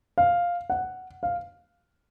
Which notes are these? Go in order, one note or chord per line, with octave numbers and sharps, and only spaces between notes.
F5
F#5
F5